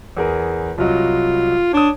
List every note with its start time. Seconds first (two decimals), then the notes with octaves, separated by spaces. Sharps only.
0.17 E2 G#4 A#4
0.78 C2 F#3 F4 D#5
1.73 D4 C#5 D#6